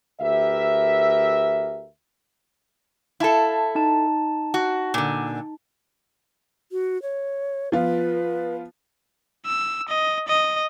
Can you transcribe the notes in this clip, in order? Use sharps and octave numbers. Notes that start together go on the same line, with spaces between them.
D2 G4 A#4 B4 E5
E4 A4 F5 A5
D#4 A5
F#4
A#2 D3
F#4
C#5
F3 B3 F4 B4
E6
D#5
D#5